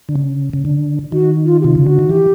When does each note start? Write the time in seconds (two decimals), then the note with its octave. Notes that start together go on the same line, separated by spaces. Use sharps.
0.09 D3
0.15 C#3
0.53 C#3
0.65 D3
1.12 D#3 F#4
1.45 F4
1.61 G4
1.64 C3 F4
1.75 C#3
1.86 D3 F#4
1.99 D#3
2.09 E3 G4